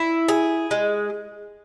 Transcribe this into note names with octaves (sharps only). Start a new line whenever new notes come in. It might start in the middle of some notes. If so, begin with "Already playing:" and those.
Already playing: E4
G#4
G#3